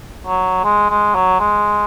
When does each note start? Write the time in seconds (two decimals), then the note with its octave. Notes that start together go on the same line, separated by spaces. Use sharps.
0.26 F#3
0.64 G#3
0.90 G#3
1.15 F#3
1.40 G#3